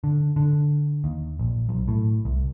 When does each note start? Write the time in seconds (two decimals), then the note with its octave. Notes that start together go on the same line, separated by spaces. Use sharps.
0.04 D3
0.36 D3
1.04 D#2
1.39 A#1
1.69 B1
1.88 A2
2.25 C2